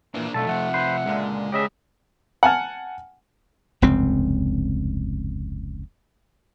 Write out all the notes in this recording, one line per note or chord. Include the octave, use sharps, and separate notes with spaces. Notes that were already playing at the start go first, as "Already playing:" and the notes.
A#2 E3 A#3 D4
B1 F2 D3 A3 A4 A5
C3 F3 E5 F#5
B4 C5
C#2 A#2 D3 G#3
C#3 G4 D#5 E5
F#5 G#5 A5 F6
F1 C#2 G2 C4